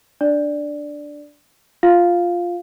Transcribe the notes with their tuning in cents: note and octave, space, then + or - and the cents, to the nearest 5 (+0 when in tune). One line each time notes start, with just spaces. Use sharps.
D4 +0 D5 +0
F4 +0 F5 +0